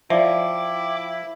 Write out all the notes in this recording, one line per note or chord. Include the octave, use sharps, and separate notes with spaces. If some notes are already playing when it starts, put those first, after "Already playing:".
F3 E4 D5 E5 G5 D6